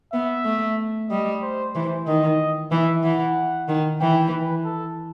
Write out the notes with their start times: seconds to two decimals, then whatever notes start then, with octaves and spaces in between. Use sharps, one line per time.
0.13 B3 E5
0.45 A3
1.10 G3 D#5
1.42 C5
1.75 E3 C5
2.07 D#3 D#5
2.71 E3 E5
3.03 E3 F#5
3.68 D#3
4.00 E3 G5
4.33 B4
4.65 A4